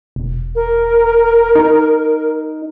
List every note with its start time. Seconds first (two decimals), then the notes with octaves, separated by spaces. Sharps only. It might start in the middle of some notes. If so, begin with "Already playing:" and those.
0.16 E1
0.55 A#4
1.55 D#4